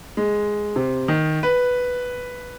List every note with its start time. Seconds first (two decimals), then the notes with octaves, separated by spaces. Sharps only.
0.17 G#3
0.76 C3
1.08 D#3
1.43 B4